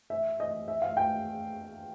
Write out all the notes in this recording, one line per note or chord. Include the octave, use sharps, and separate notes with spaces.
E5
D#5
E5
F5
G5